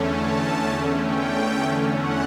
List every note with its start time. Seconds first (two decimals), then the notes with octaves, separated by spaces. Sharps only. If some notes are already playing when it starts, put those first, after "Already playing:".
Already playing: E2 D3 A3 C#4
0.09 A5
1.00 G5
1.92 F#5